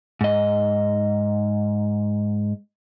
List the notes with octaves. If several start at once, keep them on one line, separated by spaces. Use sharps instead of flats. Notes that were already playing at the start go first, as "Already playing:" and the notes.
G#2 D#5